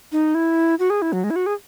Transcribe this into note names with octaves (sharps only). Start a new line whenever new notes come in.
D#4
E4
F#4
G#4
E4
F#3
G#3
E4
F#4
G#4